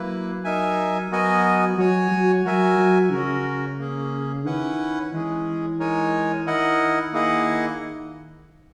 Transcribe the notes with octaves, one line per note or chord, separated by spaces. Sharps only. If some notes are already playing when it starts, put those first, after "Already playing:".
Already playing: F#3 A#3 E4 B4
D#4 A#4 E5 G#5
F#3 B3 F#4 A#4 D#5 G#5
F#3 F#4 C#5 G#5
F#3
F#3 F#4 A#4 E5 G#5
F#3
C#3 C#4 F#4 A#4
A#3 C#4 G#4
D#3 C#4 E4 B4 F#5
E3 G#3 C#4 G#4
G#3 D#4 A#4 C#5 G#5
D#3 E4 A#4 D#5 F#5
A#3 E4 G#4 D#5 F#5